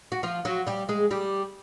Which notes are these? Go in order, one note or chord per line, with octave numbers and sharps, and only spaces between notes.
F#4
F3 F4
F#3 F#4
G3 G4
G#3 G#4
G3 G4